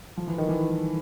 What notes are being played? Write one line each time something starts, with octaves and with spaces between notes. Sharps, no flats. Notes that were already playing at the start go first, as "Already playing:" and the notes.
F3
E3
D#3
E3